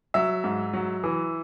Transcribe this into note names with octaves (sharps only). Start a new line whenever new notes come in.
F#3 E5
G#2
F#3
E3